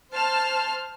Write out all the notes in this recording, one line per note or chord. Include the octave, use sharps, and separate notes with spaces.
C5 A5 F6